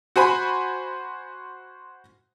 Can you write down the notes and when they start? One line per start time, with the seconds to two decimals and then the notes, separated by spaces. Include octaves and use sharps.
0.16 F#4 C5 G#5 B5